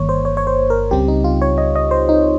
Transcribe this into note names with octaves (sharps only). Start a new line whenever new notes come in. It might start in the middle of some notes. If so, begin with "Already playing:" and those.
Already playing: G1 G2 D#3 A#3 C#5
C5
C#5
C#5
C5
A#4
C#2 C#3 G3 C4 G4
D#4
F4
C#5
D#5
D#5
C5
D#4